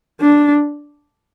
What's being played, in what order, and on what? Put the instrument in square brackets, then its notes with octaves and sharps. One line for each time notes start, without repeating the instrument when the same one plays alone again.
[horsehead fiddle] D4